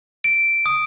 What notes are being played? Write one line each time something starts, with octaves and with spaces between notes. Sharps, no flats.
D7
D#6